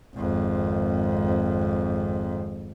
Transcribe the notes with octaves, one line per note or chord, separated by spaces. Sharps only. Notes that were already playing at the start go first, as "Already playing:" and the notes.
G#1 F2